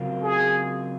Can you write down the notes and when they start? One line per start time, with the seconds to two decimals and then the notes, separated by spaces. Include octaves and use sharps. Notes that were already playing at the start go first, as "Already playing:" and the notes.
Already playing: C#3 F#3 C4 F4 A#4
0.23 G#4